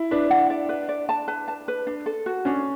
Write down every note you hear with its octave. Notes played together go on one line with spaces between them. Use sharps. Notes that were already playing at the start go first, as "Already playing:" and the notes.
Already playing: E4
D4 B4
F#5
D5
B4
D5
A5
B4
A5
B4
D4
A4
F#4
C#4 D4